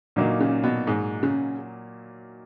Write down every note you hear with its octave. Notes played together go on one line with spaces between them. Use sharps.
A#2 D3 F#3 A#3 D#4
C#3
B2
G#2
C#3